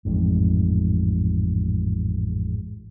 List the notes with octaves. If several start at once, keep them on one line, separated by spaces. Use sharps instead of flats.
A1 F2 G#2